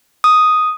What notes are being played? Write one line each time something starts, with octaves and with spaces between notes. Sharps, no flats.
D#6